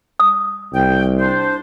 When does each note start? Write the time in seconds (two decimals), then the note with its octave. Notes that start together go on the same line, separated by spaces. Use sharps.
0.20 D#6
0.74 C2 G5
1.18 D4 C5